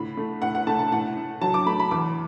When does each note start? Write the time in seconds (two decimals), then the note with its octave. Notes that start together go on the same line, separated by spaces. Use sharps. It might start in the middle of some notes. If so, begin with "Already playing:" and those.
Already playing: A2 D3 B5
0.17 A3
0.42 A2 F#5
0.55 F#5
0.67 A3 A5
0.79 A5
0.92 A2 F#5
1.17 A2
1.41 F#3 A5
1.54 D6
1.66 A3 B5
1.80 B5
1.91 E2 D6